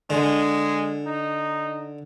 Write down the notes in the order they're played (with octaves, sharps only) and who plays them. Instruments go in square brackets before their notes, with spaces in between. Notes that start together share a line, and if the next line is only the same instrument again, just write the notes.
[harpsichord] D3 [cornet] G#3
[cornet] D#4